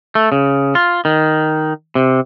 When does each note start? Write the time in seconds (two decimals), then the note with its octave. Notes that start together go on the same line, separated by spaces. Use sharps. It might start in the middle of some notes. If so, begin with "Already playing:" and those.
0.15 A3
0.32 C#3
0.75 F4
1.05 D#3
1.95 C3